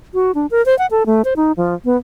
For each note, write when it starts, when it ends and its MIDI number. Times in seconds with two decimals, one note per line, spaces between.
0.14 0.32 66
0.35 0.46 62
0.51 0.64 70
0.66 0.77 72
0.79 0.86 78
0.91 1.06 69
1.06 1.22 57
1.25 1.34 72
1.36 1.52 63
1.57 1.74 53
1.85 1.97 59